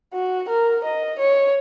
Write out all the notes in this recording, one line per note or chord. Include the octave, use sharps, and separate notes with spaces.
F#4
A#4
D#5
C#5